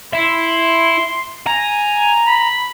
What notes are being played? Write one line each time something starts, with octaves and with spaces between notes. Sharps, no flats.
E4 E5 C6
G#5 A#5
B5